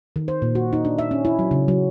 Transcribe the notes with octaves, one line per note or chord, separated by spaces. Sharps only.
D#3
C5
A#2
F#4
D#4
D4
E5
C#4
E4
F#3
C#3
F#3